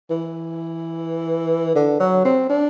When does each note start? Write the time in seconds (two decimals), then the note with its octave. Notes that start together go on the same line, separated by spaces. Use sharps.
0.10 E3
1.75 D3
2.00 F#3
2.25 C4
2.50 D4